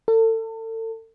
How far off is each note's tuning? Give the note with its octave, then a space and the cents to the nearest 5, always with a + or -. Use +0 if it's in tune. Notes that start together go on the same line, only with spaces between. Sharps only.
A4 +35